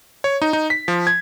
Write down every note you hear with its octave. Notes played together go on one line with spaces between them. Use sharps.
C#5
D#4
D#4
B6
F3
G#6